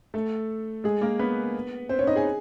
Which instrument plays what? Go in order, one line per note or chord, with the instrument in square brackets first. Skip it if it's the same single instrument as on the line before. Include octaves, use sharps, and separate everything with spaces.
[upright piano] A3 A4
G#3 G#4
A#3 A#4
B3 B4
C4 C5
C#4 C#5
D#4 D#5
G#4 G#5